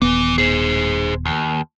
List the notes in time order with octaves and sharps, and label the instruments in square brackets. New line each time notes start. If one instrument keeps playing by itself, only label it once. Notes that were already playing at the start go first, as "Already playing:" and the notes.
[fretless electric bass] D#1 B3 [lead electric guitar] E3
[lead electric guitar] G#4 C5
D#2